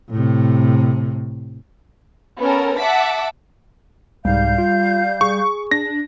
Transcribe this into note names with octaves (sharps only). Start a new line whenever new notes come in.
A2 C3
B3 C#4 A4 A#4
E5 F#5 A5 D6 B6
C2 G#2 G3 F5 G6
F4
G#4 C#6
D4 A#6